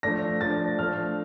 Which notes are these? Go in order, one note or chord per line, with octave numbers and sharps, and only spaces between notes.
F3 A3 D4 A#6
F3 A3 D4 A6
F3 A3 D4 F6